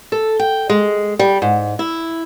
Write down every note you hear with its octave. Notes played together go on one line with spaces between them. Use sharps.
A4
G5
G#3
G3
G#2
E4